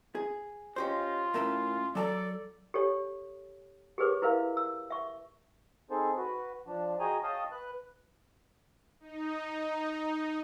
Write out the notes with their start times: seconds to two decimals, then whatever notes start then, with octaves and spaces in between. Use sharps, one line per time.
0.15 G#4
0.76 C#4 F4 G4 C5 D#5
1.34 A2 C#4 A#4 E5
1.95 F#3 A4 D5 A5 A#5
2.74 G4 A4 C#5
3.98 G4 G#4 A#4 B4 C#5 D6
4.22 E4 A#4 B4 E5 F5
4.57 E6
4.90 E5 C#6
5.90 C4 D#4 G#4 A4 C5
6.17 F#4 B4
6.67 F3 D4
7.00 F#4 G#4 D#5 G5 G#5 A#5
7.23 C#5 D#5 F5 G5 A5 D#6
7.52 B4 F#6
9.00 D#4